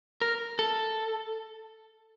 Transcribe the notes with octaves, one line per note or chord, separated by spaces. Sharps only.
A#4
A4